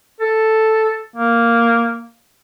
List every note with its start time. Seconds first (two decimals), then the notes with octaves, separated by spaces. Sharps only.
0.20 A4
1.16 A#3